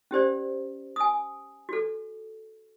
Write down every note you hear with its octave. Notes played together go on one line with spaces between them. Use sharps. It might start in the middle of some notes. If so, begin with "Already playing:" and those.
C#4 G4 C5 D5
G#5 D#6
F#4 A4